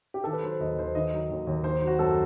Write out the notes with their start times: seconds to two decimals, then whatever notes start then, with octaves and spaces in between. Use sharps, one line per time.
0.14 G4
0.24 D#3 A4
0.33 B4
0.43 F#3 C5
0.60 D#2 D#5
0.78 D#2 C5
0.95 D#3 D#5
1.13 F#3
1.31 D#2
1.47 D#2
1.64 D#3 C5
1.82 F#3
1.87 F#4
1.99 F#2 A4